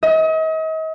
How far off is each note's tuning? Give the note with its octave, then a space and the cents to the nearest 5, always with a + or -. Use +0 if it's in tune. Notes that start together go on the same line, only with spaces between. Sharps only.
D#5 +40